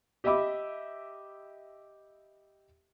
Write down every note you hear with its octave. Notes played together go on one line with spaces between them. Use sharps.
G4 D#5 E5 B5 D6